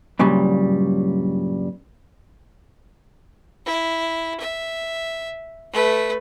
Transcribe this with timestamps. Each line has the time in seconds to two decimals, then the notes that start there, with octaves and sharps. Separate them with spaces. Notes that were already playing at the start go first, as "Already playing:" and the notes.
0.19 G2 A#2 C#3 F#3 G3
3.66 E4
4.40 E5
5.72 A3 B4